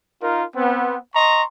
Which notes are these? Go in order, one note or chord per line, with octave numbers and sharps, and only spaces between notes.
D#4 F4 A#4
B3 C4
D#5 A#5 C6 C#6